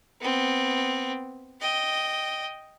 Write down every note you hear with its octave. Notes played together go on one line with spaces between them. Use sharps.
B3 C4
D#5 G5